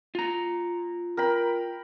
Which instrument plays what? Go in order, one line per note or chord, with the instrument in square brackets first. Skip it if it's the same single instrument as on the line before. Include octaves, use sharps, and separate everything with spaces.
[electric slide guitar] F4 A#5
[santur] A#4 G5 B5